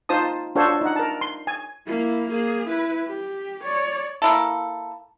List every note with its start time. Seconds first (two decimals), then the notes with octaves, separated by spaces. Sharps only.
0.09 D#4 F4 C5 A5 D#6
0.55 D4 F4 F#4 A4 C5 C#5
0.81 D#4 F#5
0.96 A#4 A5
1.21 C6
1.47 G#5
1.87 A#3 E4
2.30 A#3 G#4
2.68 E4 B4
3.07 G4
3.64 C#5 D5
4.22 A#3 E4 A4